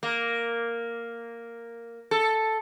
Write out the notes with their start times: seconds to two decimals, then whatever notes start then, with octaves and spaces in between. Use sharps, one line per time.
0.03 A#3
2.11 A4